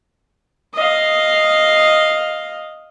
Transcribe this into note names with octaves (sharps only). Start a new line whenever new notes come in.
D#5 F5